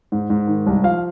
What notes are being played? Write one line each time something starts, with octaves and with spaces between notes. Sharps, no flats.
G#2
G#2
D#3
C2
F3 F5